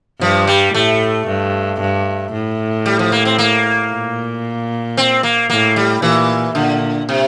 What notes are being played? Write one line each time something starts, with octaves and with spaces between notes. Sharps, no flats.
G2 F3
G3
A2 A3
G2
G2
A2
G3
F3
A#3
C4
A#3
A#2
C4
A#3
A2 A#3
G3
A#2 E3
A#2 D3
C3